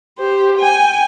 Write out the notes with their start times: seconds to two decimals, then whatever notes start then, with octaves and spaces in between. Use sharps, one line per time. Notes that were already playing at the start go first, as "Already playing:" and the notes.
0.18 G4 C5
0.57 G5 G#5